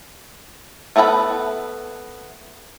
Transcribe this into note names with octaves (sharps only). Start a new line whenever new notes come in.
A3 B3 A4 A#5 B5